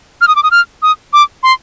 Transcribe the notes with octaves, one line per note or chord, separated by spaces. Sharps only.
F6
D#6
D6
D#6
F6
D#6
D6
C6